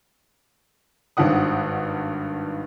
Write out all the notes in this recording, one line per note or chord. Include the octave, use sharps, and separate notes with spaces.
G#1 G2 D#3 F#5 D#6